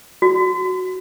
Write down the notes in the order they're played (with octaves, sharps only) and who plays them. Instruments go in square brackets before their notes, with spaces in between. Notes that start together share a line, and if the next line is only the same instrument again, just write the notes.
[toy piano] F#4